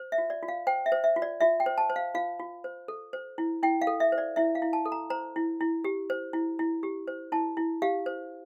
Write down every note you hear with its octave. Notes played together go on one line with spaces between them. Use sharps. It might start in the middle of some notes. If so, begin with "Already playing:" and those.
Already playing: C5
E5
F4
D5
F4
F5
C5 G5
E5
C5
E5
F4
D5
F4 E5
G5
C5
A5
C5
F5
F4 F5
F4
C5
A4
C5
E4
E4 G5
F5
A4
E5
C5
D5
E4 E5
F5
E4
A5
A4
A#5
C5 A#5
E4
E4
G4
C5
E4
E4
G4
C5
E4 A5
E4
G4 F5
C5